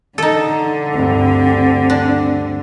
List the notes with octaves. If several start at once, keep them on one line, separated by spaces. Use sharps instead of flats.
D3 D#4 A4
D2 G2 C4
D4